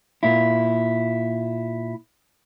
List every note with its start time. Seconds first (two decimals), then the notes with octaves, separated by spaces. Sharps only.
0.23 A#2 E4